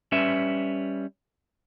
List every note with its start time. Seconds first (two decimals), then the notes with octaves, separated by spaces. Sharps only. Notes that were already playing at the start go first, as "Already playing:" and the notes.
0.12 G3 C#4 B4 E5